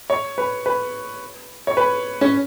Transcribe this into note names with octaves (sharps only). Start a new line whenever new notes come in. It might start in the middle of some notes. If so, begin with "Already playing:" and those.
C#5
B4
B4
C#5
B4
C#4